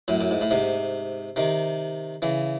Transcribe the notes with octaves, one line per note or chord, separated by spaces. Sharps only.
F#2 A2
F#2
G#2
A2
G#2 C3
C3 D#3
C#3 E3